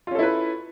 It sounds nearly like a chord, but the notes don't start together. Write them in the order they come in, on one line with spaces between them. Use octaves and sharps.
F4 C#4 A4 E4 B4